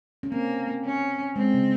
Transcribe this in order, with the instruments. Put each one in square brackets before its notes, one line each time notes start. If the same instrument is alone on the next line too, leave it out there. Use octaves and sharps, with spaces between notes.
[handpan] C#4
[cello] A#3 [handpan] C4
[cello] C#4
[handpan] G#3 [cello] C4
[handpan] C#3